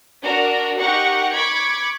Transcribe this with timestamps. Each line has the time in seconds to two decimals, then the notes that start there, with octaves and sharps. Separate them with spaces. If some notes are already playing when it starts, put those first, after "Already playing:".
0.23 D4 F#4 A#4
0.78 D#4 G4 A#4 F#5 C#6
1.34 B5 C#6 D6 G#6